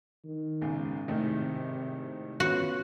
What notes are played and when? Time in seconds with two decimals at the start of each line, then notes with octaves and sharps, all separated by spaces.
0.24 D#3
0.61 B1 G#2 C#3
1.08 G#1 A2 C3 D#3
2.40 B3 C#4 F4 F#4